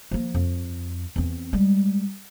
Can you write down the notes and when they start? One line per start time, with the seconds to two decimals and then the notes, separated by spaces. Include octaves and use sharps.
0.11 F3 A#3
0.35 F2
1.16 E2 C4
1.53 G3 G#3